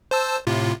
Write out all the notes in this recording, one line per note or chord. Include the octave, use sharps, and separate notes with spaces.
C5 A5 E6
A2 C3 F4